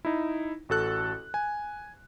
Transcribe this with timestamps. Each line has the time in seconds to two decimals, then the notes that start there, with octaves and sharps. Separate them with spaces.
0.05 D#4 E4
0.69 A1 F#4 A4 F#6
1.34 G#5